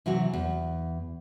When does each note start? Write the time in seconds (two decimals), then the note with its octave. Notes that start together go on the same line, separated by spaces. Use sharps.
0.06 C3 E3 F#3 F#4
0.33 E2